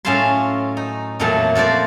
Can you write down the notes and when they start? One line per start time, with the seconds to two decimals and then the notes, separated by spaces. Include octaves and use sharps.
0.05 A2 F#3 C#4 F4 A5 C6
0.77 D#4
1.20 F2 A#2 E3 F#3 A3
1.55 F3 F#4 C5 D5